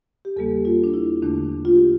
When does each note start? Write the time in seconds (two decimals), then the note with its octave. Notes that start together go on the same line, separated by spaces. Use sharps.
0.25 G4
0.36 E2 C#3 G3 A#3 A4
0.65 F4
0.84 D4
0.94 E4
1.22 E2 D3 A3 D4
1.65 F4
1.75 G4